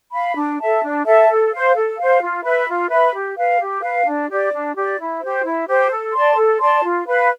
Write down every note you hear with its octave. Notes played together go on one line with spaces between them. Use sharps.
F5 B5
D4
A4 E5 A5
D4
A4 E5 A5
A4
C5 F5
A4
C5 F5
F4
B4 E5 B5
F4
B4 E5 B5
G4
B4 F5
G4
B4 F5
D4
G4 D5
D4
G4 D5
E4
G4 C5
E4
G4 C5
A4
D5 A5 C6
A4
D5 A5 C6
F4
B4 F5 B5